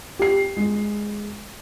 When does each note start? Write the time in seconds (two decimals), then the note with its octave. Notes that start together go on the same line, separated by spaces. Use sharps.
0.19 G4 C7
0.57 G#3